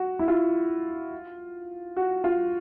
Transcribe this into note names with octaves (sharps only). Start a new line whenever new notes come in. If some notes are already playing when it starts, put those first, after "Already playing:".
Already playing: F#4
E4
F4
F#4
F4